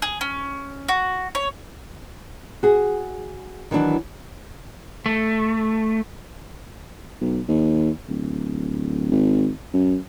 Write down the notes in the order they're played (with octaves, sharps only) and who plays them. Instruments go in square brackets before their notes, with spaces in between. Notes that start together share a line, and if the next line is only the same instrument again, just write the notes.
[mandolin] G#4
C#4
F#4
C#5
[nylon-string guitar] F#4 G#4
D#3 E3 F#3 D4
[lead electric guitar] A3
[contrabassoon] B1
D#2
D1
G#1
F#2